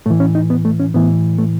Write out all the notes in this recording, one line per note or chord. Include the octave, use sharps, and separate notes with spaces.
A2 E3 A3
C#4
D#4
B3
A3
C#4
A2 E3 B3
A3